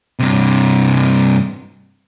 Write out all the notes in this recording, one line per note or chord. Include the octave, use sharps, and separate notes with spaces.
G2 C3